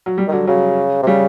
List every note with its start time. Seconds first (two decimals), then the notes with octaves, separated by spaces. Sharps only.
0.06 F#3
0.18 G3
0.27 D#3
0.32 D3 F#3
0.47 C#3 F#3
1.02 C3
1.07 C#3 G3